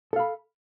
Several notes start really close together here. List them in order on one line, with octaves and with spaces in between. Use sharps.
A4 F5 B5